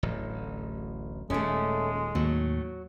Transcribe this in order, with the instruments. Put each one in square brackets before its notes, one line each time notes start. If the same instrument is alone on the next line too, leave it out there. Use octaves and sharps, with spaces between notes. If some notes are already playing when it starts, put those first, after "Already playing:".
[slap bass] D1 A1
[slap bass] D#1 D#2 A#2 [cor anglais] G#3 [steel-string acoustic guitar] A3 C#4
[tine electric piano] D#2 [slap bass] A2 [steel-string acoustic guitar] F#3